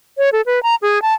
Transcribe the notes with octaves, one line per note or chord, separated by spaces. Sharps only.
C#5
A4
B4
A#5
G#4
A5